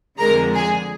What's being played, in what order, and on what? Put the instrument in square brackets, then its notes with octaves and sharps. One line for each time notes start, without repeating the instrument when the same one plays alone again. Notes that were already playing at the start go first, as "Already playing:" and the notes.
[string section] F2 D3 G#3 A#4 A#5
G#4 G#5